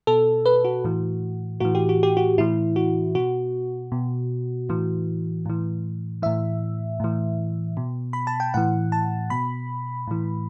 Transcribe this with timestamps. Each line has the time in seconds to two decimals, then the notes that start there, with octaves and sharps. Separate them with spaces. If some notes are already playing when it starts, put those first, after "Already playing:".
0.07 B2 A4
0.46 B4
0.64 F#4
0.84 A2 E3
1.60 A2 E3 F#4
1.75 G4
1.89 F#4
2.03 G4
2.17 F#4
2.38 A2 E3 E4
2.76 F#4
3.15 B2 F#4
3.92 B2
4.69 A2 E3
5.46 A2 E3
6.22 A2 E3 E5
7.00 A2 E3
7.77 B2
8.13 B5
8.27 A5
8.40 G5
8.54 A2 E3 F#5
8.92 A5
9.30 B2 B5
10.07 A2 E3